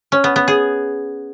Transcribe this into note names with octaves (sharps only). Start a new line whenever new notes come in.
C#4
B3
B3
G#4